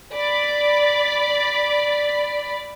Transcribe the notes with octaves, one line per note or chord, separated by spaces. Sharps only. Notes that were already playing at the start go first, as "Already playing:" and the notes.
D5 B5